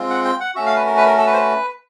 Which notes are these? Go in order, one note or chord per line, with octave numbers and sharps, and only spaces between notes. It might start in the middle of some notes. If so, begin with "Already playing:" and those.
Already playing: G#3 C4 F4
F#5
G5
F#5
A3 C#4 F#4 E5
F5
B4
A#4
B4
A#4
A4
B4
C5
B4